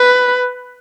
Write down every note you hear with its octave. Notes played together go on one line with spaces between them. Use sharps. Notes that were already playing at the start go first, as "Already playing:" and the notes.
Already playing: B4